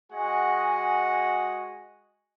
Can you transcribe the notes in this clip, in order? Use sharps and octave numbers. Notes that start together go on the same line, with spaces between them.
G#3 F#4 G#4 D#5 F#5 G#5